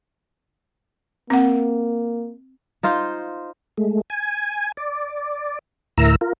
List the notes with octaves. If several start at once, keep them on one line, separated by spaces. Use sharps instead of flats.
A#3 C4 F#5
D#4 F4 C5
G#3 A3
G#5
D5
D2 A2 E4 A#4 A#5 E6
F4 A#4